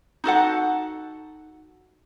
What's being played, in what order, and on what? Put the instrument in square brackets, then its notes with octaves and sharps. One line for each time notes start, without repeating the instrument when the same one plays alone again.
[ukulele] D#4 F#4 A4 F#5